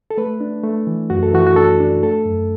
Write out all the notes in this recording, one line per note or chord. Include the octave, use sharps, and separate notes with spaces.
A4
A3 B4
D4
A3
E3
F#2 F#4
A4
E3 F#4
F#4
D4 A4
D4
A3 A4
F#2